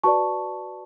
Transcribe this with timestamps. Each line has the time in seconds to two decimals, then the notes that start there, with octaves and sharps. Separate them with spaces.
0.04 F#4 B4 D5 A5 C#6